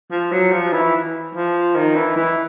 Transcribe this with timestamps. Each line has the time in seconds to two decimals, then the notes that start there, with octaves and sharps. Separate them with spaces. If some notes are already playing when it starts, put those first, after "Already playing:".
0.11 F3
0.32 F#3
0.52 F3
0.73 E3
1.35 F3
1.76 D#3
1.96 E3
2.16 E3